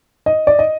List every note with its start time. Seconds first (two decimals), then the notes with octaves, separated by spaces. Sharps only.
0.26 D#5
0.47 D5
0.59 D#5